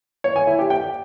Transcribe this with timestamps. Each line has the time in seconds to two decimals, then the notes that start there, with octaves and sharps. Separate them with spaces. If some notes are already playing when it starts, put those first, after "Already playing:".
0.24 C#5
0.36 G#5
0.47 E4
0.59 G4
0.70 G5